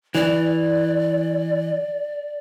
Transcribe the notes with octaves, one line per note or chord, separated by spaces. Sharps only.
E3 D5